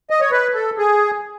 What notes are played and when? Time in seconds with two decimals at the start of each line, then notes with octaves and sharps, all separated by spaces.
0.10 D#5
0.21 C#5
0.31 B4
0.54 A4
0.78 G#4